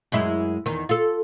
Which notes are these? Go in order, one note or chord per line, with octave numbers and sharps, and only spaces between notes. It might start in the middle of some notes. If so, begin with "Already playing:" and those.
F#2 G#3 E4
E2 D#3
F4 A4